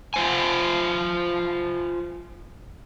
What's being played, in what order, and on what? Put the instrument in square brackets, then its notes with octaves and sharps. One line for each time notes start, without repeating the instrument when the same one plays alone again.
[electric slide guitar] F4 C5 G#5